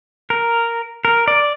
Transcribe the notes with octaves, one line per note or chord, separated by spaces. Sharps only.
A#4
A#4
D5